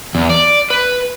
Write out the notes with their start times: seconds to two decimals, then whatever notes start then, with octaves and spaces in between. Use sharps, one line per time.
0.15 E2
0.30 D5
0.70 B4